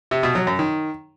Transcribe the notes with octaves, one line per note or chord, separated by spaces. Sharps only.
C3
B2
F#3
F#2
D#3